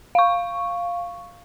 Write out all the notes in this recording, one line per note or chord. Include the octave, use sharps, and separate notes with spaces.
F5 C#6